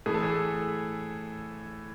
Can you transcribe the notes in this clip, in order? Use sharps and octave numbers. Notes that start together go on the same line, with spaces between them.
A2 E3 A3 G#4
A4
G#4